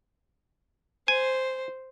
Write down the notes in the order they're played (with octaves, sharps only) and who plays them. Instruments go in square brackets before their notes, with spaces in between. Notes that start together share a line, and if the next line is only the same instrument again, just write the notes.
[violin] C5 [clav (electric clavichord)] G#5